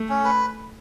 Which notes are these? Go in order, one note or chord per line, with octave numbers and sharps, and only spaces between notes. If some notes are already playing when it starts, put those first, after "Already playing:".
Already playing: A3
C#4
B4